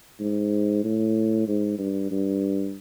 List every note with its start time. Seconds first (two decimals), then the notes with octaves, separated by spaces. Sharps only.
0.20 G#2
0.84 A2
1.48 G#2
1.78 G2
2.11 G2